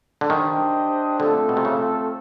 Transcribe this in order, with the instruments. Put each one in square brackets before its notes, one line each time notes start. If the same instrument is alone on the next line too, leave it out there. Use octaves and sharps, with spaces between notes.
[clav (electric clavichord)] D3
[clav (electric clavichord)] D#3 [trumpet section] D4 G4 C5 D#5 G5
[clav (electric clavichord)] D3 [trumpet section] A3 C4 F4 A4
[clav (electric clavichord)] B2
C3
C#3